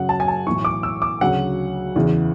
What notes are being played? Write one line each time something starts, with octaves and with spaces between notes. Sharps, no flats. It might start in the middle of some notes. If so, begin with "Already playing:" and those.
Already playing: F#2 C#3 F#3 F#5
A5
G#5
A5
B1 A2 E3 C#6
D6
E6
D6
D2 C#3 F#3 F#5
E2 C#3 E3